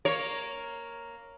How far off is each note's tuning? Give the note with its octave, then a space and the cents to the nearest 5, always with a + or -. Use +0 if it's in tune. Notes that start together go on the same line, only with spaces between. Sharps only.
A#3 +0 C#5 +0